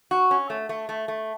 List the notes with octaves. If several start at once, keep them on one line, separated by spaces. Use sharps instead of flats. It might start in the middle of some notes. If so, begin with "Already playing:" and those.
F#4
C#4
A3
A3
A3
A3